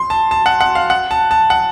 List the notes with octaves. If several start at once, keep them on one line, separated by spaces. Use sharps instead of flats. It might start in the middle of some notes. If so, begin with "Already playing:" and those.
Already playing: C6
A5
A5
F#5
F#5
F5
F#5
A5
A5
F#5